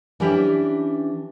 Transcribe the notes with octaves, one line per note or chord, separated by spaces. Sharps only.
E3 C#4 D4 G4 B4 E5